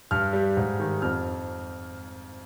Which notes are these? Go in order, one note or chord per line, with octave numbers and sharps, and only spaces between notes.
G2 F6
G3
G#2
D#3 G3
F2 F6